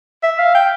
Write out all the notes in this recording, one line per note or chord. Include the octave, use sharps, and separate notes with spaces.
E5
F5
G5